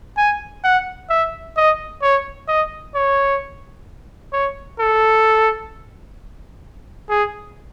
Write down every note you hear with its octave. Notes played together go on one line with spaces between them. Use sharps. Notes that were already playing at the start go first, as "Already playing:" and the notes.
G#5
F#5
E5
D#5
C#5
D#5
C#5
C#5
A4
G#4